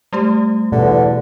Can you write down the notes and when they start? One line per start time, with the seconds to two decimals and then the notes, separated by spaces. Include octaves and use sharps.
0.13 G3 A3 G4
0.72 E2 B2 D3